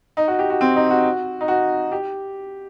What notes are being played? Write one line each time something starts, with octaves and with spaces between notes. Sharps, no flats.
D#4
F#4
G4
F#4
C4
D#4
F#4
D#4
F#4
G4